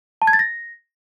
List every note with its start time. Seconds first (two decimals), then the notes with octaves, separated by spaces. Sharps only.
0.22 A5
0.27 G#6
0.33 A6
0.39 A#6